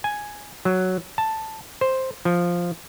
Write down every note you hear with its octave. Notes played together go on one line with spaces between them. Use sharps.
G#5
F#3
A5
C5
F3